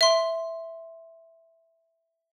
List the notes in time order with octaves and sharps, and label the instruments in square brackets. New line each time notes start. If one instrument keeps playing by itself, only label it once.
[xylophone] E5 C6